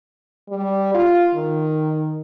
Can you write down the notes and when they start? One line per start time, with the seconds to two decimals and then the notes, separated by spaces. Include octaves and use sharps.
0.49 G3
0.94 F4
1.34 D#3